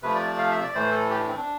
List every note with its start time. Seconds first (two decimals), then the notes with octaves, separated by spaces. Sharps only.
0.03 C3 F3 A3 B4
0.15 D5
0.27 D5
0.38 F5
0.51 E5
0.63 D5
0.74 A2 E3 A3 C5
0.92 A4
1.10 G4
1.19 D4
1.28 C4
1.37 D4